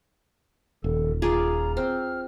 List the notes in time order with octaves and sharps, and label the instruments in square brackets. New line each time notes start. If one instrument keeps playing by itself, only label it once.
[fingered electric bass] D#1 [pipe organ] D#3 A4
[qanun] F4 G#4 D5 [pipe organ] A#5
[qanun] C4 [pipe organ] F6